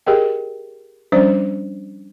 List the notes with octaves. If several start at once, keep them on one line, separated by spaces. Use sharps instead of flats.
G4 G#4 A#4 D#5 G5
F3 G3 C#4 D4 C5 D5